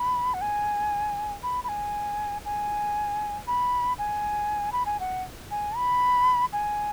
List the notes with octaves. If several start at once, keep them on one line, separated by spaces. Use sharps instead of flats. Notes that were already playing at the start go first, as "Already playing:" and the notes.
Already playing: B5
F#5
G#5
B5
B5
G#5
G#5
B5
G#5
B5
G#5
F#5
G#5
B5
G#5